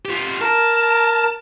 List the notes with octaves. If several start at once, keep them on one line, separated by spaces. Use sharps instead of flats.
F4 G4
A#4 A5